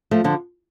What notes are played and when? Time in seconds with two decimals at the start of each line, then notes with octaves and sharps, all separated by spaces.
0.11 F3 A3
0.24 D3 F3